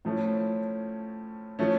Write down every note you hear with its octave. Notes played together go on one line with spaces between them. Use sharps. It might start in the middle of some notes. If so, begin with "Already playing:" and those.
A2 F3 A3 C#4
F3 A3 C#4